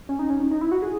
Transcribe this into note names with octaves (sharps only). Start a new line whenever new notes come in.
C#4
D#4
C#4
D#4
D#4
E4
F#4
G#4